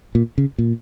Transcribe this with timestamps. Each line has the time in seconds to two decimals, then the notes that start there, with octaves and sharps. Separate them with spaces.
0.15 A#2
0.38 C#3
0.58 A#2